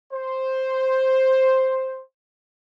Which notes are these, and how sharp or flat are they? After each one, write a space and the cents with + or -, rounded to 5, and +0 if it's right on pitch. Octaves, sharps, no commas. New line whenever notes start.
C5 +5